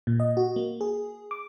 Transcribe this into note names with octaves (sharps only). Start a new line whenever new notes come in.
A#2
D#5
F#4
A#3
G#4
D6